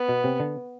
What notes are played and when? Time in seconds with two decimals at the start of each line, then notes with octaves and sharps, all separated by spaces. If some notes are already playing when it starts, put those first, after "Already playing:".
Already playing: B3
0.09 B2
0.24 C3
0.40 D3